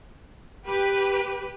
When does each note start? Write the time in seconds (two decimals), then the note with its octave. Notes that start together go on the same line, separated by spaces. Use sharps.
0.66 G4 B4